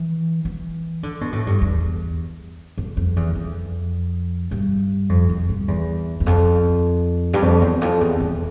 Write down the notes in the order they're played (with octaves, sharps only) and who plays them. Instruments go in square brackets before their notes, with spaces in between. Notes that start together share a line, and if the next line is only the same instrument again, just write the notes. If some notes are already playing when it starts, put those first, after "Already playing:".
Already playing: [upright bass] E3
E3
D3
B2
A2
G2
E2
F2
F2
E2
F2
G2
F2
F2
G2
E2
E2
F2
G2
F2
E2
F2
E2
E2